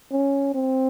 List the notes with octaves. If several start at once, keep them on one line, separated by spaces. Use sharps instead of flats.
C#4
C4